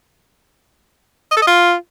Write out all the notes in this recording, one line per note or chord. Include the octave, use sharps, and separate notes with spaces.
D#5
A4
D#5
F4